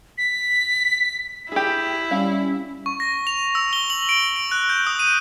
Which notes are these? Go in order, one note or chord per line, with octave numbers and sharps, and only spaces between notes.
B6
E4 G4 G#4
G3 C#4 F5
C#6
A#6
F7
E6
G7
F#7
D7
D7
F#6
G6
D#6
D#7